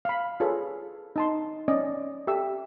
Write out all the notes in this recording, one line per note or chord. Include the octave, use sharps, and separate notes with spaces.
F5 B5
F4 G#4 A4 B4 C#5
D#4 A5 C6
C#4 D5 D#5
G4 A4 E5 E6